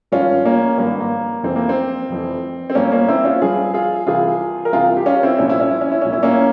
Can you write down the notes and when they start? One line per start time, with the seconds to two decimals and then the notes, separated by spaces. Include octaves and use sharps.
0.12 G#1 G2 F3 C#4 F4
0.45 A#3 C#4
0.78 G#1 G2 F3 A#3
1.00 A#3
1.43 F1 F2 E3 C4
1.56 A#3
1.69 C4
2.09 F1 F2 E3
2.70 C4
2.75 G1 G2 F3 A#3 C#4
2.92 A#3 C#4
3.08 C4 E4
3.25 C#4 F4
3.41 G1 G2 F3 F4 G#4
3.74 F4 G#4
4.07 C2 C3 E3 F4 G#4
4.65 A#4
4.73 C2 C3 E3 F4 G#4
4.97 G4
5.06 C#4 F4
5.23 C4 E4
5.38 C2 A#2 F3 C#4
5.49 E4
5.60 C#4
5.70 E4
5.81 C#4
5.92 E4
6.01 C2 A#2 F3 C#4
6.13 E4
6.23 A#3 C#4